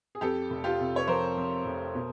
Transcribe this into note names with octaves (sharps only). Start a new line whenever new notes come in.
G#4
F2 G4 A4
F1
F4 G4
C3
C#5
F3 A#4 C5
F2
F1
B2